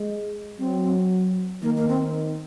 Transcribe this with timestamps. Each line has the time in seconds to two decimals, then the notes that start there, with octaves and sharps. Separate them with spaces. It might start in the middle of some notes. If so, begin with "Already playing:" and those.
Already playing: G#3
0.59 F#3 C4
1.62 D#3 A#3
1.77 A#3
1.88 C4